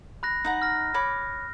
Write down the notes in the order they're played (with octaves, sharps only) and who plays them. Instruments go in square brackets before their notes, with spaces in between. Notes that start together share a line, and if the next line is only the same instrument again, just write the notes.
[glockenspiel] B5 F#6 A#6
[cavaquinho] D#4 F#5 A#5
[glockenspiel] F6 A#6
[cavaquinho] C#5 B5 D6